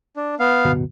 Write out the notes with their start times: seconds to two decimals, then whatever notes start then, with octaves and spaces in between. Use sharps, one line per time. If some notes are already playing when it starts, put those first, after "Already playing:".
0.16 D4
0.39 B3 F5
0.65 D1 G1 B2